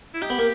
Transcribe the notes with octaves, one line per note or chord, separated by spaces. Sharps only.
E4
D#4 G4
B3
A#3